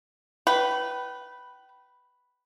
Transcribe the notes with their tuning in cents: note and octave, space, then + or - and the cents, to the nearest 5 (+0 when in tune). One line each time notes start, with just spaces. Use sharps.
B4 +0 G5 -30 B5 +0